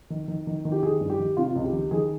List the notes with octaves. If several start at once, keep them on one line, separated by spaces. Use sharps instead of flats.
D#3
D#3
D#3
D#3
G4
D#3 G#4
G2
G4
D#3
C3 F4
C#2
G4
D#3
D#3 G#4